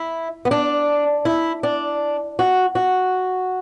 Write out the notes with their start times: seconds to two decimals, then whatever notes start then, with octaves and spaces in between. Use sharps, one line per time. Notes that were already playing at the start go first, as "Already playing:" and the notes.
Already playing: E4
0.45 B3
0.51 D4
1.25 E4
1.63 D4
2.39 F#4
2.75 F#4